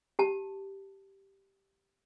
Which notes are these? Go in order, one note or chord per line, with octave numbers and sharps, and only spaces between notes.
G4 A5